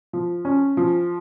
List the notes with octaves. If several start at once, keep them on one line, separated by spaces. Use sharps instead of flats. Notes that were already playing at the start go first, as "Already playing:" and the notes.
F3
C#4
F3